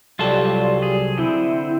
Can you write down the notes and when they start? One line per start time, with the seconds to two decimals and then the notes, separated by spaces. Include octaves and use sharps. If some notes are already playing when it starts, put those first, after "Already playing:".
0.19 C2 F#3 G3 F4 A4
0.82 G#4
1.18 D3 C4 E4